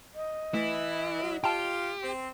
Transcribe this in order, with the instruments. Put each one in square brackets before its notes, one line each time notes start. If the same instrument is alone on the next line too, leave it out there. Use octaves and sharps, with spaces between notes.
[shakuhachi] D#5
[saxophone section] E3 [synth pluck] A3 [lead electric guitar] E4
[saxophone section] F#3
[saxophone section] F4 [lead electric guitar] G4 [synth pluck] G5 A5
[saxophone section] C4